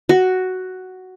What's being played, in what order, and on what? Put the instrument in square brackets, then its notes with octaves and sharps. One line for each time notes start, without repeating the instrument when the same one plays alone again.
[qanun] F#4